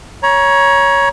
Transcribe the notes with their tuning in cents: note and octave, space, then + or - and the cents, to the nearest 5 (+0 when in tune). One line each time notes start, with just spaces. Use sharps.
C#5 +5 A#5 +30